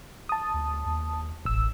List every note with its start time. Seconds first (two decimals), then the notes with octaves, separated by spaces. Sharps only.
0.29 A5 D#6
0.54 D2
0.86 D#2
1.45 E1 A1 E6